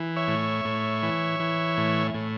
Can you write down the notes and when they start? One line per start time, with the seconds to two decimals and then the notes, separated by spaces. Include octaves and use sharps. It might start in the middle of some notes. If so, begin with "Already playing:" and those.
Already playing: E3
0.16 C#5 E5
0.28 A2
0.65 A2
1.03 E3
1.40 E3
1.77 A2
2.14 A2